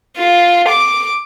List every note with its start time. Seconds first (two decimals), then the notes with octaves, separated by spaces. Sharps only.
0.17 F4
0.68 D6